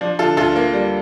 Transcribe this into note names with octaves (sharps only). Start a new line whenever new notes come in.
F3 D4
D3 F4 A4
D2 F4 A4
A#3
G3